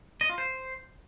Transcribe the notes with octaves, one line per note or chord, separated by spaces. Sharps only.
D#5
F4
C5